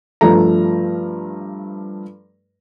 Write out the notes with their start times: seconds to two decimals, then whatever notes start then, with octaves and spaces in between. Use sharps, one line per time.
0.21 G2 F3 A3 A#5